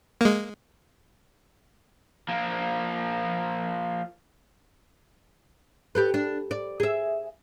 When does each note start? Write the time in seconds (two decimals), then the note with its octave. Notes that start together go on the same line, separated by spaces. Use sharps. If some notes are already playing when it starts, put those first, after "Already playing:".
0.21 G#3 A#3
2.29 F3 A#3
5.95 G4 A4 B4
6.14 D4
6.51 D5
6.80 G#4 E5